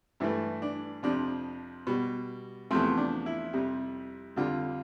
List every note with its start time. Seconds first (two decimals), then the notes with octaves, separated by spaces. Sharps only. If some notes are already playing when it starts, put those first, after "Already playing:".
0.20 G2 E3 A3 E4
0.62 D4
1.03 F2 C3 F3 D4
1.87 B2 G3
2.71 E2 C3 F3 A3 C4
2.98 D4
3.26 E4
3.53 F2 C3 G3
4.36 F2 D3 G3 F4